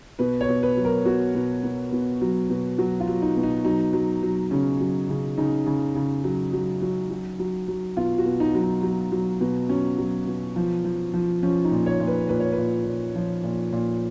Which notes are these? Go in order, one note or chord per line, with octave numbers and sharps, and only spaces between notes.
B2 B4
C#5
B2
B4
F#3
A#4
B2 F#4
B2
B2
B2
F#3
B2
F#3 F#4
F4
F#3
D#4
B2
D#4
F#3 D#4
F#3
F#3
C#3 C#4
F#3
C#3
C#3 D#4
C#3
C#3
F#3
F#3
F#3
F#3
F#3
F#3
B2 F4
F#4
B2
D#4
F#3
D#4
F#3
F#3
B2
F#3 C#4
F#3
B2
F3
F3
F3
F3 C#4
D#4
A#2
C#5
A#2
B4
A#2 B4
C#5
B4
A#2
A#2
F3
A#2
A#2